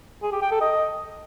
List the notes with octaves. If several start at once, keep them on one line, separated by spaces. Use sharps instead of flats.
G#4
G4
G5
A4
D#5